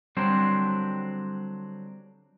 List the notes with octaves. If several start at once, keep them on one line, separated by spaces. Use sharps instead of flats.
D3 F#3 G3 C4 D4 C5